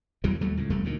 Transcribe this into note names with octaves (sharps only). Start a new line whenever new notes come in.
E2 E3 F#3 G3
D#2 F#3 G3 A3
C#2 A2
F1 E2 G3 A3
D2 A#2 D#3